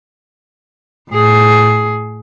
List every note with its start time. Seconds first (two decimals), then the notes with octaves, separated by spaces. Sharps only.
1.10 A2 G#4